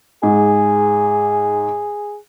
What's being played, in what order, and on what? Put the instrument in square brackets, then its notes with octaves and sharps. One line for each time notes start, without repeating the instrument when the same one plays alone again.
[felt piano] G#2 [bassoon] G#4